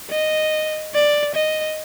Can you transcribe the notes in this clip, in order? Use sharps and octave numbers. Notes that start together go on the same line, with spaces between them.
D#5
D5
D#5